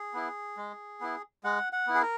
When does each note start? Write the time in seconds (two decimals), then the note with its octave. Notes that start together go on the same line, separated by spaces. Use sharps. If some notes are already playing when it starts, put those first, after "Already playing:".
Already playing: G#4
0.14 B3 E4
0.57 G#3
1.01 B3 E4
1.44 G#3 F#5
1.73 F#5
1.87 B3 E4
1.95 G#4
2.02 A#4